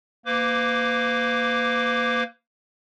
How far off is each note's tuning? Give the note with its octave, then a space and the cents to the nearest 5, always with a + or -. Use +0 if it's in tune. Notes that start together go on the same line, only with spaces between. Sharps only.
A#3 +0 B4 +40 D6 +0